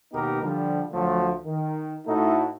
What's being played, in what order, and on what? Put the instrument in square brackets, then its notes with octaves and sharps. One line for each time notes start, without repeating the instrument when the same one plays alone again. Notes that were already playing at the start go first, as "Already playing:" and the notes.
[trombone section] D#2 B2 B3 D#4 G4 A#4
D3 F3 G3
D2 F3 F#3 A3
D#3
A2 A3 D#4 E4 F#4 A4